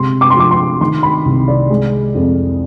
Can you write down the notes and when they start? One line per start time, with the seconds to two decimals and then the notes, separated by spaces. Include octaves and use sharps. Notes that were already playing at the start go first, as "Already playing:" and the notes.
Already playing: C3 G#3 C6
0.21 D6
0.30 C6
0.36 F3 D6
0.51 C6
0.81 D#3 C6
1.03 B5
1.25 C2
1.48 D5
1.70 G#3
2.15 F2